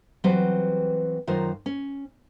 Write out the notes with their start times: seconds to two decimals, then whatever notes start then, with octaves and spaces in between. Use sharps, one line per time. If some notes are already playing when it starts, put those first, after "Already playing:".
0.24 E3 F#3 G3 C4 B4 C5
1.27 F#2 D#3 F4 A#4 C5
1.66 C#4